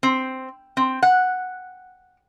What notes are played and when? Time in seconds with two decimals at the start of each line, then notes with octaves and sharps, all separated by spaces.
0.03 C4
0.77 C4
1.03 F#5